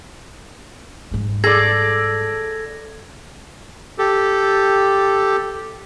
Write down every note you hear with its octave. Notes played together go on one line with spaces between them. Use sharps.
G#2 G3
G#4 A4 D5 G#6 A#6
G4 A4